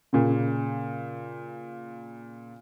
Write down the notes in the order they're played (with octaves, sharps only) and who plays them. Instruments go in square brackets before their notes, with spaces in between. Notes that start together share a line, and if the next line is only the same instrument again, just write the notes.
[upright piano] A#2 C#3